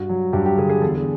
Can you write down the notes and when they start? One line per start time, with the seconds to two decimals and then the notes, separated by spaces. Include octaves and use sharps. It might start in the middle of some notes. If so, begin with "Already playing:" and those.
Already playing: G2 F#4
0.09 F#3
0.33 G2 G4
0.46 G4
0.57 D3 G#4
0.70 G#4
0.82 E2 A4
0.95 G#4